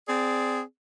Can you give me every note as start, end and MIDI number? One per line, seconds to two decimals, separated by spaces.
0.08 0.61 60
0.08 0.61 68
0.08 0.61 74